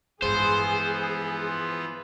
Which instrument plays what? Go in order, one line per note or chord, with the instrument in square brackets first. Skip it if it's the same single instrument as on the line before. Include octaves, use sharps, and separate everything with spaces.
[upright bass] G2 G#3 [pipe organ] E3 F3 B3 [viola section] G#4 [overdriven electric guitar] C5